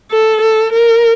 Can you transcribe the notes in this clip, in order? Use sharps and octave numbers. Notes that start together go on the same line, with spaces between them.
A4
A4
A#4